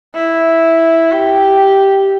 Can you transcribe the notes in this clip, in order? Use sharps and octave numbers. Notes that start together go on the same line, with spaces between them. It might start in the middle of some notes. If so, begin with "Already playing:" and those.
E4
G4